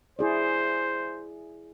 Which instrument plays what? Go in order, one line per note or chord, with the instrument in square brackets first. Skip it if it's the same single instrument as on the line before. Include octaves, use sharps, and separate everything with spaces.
[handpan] E4 G#4 D5 [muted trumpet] C5